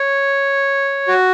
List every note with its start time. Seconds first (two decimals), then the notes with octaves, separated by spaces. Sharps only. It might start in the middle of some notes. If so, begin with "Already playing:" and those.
Already playing: C#5
1.08 F#4